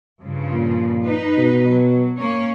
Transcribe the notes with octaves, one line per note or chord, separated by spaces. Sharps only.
G2 C#3 F3
A#2
D#4 B4
B2
F#3
A#3 C#4 C#5